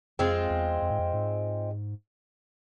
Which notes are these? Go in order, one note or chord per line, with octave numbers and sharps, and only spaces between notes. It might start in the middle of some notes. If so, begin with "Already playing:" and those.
F2 G#3 C4 F4
E2
F2
G#2
F2
G#2